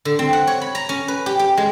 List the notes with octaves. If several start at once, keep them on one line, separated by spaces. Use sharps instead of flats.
D3
C4
F#5
C#5
B5
A#5
C#4
B4
G4
G4
G#3